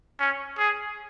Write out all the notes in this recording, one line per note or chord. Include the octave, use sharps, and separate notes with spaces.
C#4
G#4